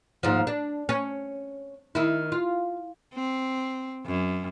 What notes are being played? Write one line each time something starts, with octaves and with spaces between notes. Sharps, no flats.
D#2 G#2 F3
D4
C#4
D#3 E4
F4
C4
F#2